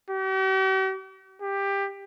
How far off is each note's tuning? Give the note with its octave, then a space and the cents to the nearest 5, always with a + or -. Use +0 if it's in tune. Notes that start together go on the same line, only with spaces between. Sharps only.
G4 -45
G4 +15